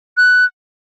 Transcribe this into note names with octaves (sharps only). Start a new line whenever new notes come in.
F#6